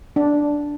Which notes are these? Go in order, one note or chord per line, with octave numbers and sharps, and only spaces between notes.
D4